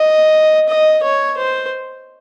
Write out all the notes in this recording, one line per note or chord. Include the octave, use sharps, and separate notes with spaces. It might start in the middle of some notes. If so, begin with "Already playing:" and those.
Already playing: D#5
D#5
C#5
C5